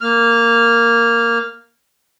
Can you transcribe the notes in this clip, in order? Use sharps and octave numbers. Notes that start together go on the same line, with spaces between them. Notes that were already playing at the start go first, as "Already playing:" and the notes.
A#3 F6